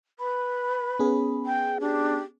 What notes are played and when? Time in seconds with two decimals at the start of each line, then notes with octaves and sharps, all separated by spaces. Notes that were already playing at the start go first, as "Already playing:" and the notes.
0.19 B4 B5
0.99 B3 C#4 G#4
1.46 G5
1.81 D4 G4